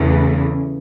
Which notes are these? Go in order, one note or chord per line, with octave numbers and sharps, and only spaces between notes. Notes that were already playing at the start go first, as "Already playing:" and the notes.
Already playing: E2 C#3 E3 A3